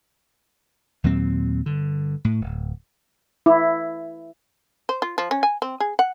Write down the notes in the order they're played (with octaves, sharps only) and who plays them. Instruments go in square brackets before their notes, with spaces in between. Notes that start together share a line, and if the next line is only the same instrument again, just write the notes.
[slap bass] D#2 A#2 F#3 C4
G2 D3
A2
D1
[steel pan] E4
[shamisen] C5
F4
F3
C#4
G#5
C4
G#4
F#5